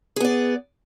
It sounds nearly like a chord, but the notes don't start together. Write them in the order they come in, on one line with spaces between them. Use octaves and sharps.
G#4 B3 D5